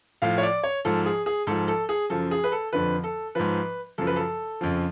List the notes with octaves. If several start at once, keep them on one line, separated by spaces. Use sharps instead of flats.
A2 F3 F5
C#5
D5
C#5
G#2 F3 A4
G#4
G#4
G#2 F3 A4
A4
G#4
F#2 C#3 F3 A4
G#4
B4
A4
F2 D3 F3 B4
A4
G#2 F3 B4
F#2 C#3 F3 A4
B4
A4
F2 C#3 F3